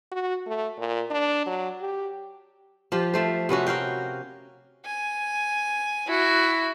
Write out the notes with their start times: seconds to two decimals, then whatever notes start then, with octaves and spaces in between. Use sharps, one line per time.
0.12 F#4
0.47 A3
0.79 A#2
1.11 D4
1.46 F#3
1.81 G4
2.92 F3 F4 G4
3.14 F3 A3 C5
3.49 C3 B3 C#4 F#4
3.67 F#4 A#4 F5 G5
4.85 G#5
6.07 E4 F#4